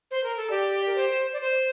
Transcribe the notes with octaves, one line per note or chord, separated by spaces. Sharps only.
C5
A#4
A4
G4 D5
A#4
C5
D5
C5